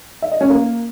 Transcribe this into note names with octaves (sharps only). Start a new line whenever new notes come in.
E5
D#5
C#4
A#3